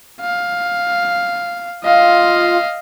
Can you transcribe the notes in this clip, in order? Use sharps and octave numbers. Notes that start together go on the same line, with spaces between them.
F5
F4 D#5 F5